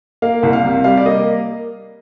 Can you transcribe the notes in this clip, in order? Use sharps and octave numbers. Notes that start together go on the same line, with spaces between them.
A#3 F5
C2
F5
C3
G3 F5
D5
A#3 D#5